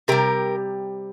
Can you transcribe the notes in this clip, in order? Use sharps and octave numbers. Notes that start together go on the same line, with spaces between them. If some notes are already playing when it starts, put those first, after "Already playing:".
C3 G3 G4 A#4